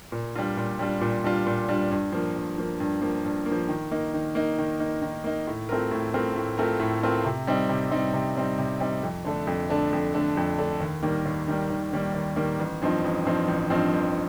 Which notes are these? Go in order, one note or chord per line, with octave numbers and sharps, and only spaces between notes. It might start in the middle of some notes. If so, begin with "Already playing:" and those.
A#2
G3 D4 F4
A#2
G3 D4 F4
A#2
G3 D4 F4
A#2
G3 D4 F4
G2
F3 A#3
G2
F3 A#3
G2
F3 A#3
G2
A#3
F3
D#3
A#3 D#4
D#3
A#3 D#4
D#3
A#3 D#4
D#3
A#3 D#4
A2
A3 C4 F4 A#4
A2
A3 C4 F4 A#4
A2
A3 C4 F4 A#4
A2
A3 C4 F4 A#4
C3
G3 C4 D#4
C3
G3 C4 D#4
C3
G3 C4 D#4
C3
G3 C4 D#4
F2
D3 A3 D4
F2
D3 A3 D4
F2
D3 A3 D4
F2
D3 A3 D4
D#2
D#3 G3 A#3
D#2
D#3 G3 A#3
D#2
D#3 G3 A#3
D#2
D#3 G3 A#3
A1
G2 F3 C4 D#4
A1
G2 F3 C4 D#4
A1
G2 F3 C4 D#4
A1